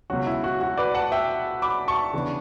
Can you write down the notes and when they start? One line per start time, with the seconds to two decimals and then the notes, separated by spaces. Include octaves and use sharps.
0.10 C#2 B2 F#3 C#4 F#4
0.27 E4
0.44 F#4
0.61 F#4
0.77 B4 D5
0.95 F#5 A5
1.12 E5 G5
1.62 B5 D6
1.88 A5 C#6
2.13 C#3 E3 B3 D4